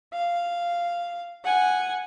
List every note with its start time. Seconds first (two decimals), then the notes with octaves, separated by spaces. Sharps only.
0.13 F5
1.44 F#5 G#5